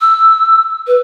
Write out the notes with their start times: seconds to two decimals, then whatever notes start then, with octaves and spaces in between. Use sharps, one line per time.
0.01 E6
0.87 B4